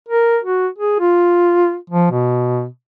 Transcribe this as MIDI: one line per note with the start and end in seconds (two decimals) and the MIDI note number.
0.09 0.38 70
0.44 0.67 66
0.78 0.97 68
1.00 1.75 65
1.90 2.11 53
2.11 2.66 47